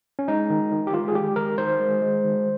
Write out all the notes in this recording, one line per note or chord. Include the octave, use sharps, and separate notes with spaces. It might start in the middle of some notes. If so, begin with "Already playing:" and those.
C#4
G#3 D#4
D#3
D#3
G4
G#3 F4
G#4
G#3 G4
D#3 A#4
D#3 C5
G#3
G#3
D#3